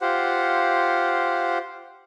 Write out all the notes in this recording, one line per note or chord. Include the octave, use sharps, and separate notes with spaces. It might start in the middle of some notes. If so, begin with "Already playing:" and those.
F4 G4 C5 F#5